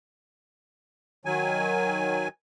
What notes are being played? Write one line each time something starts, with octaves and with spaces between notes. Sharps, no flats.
D#3 F#3 G#5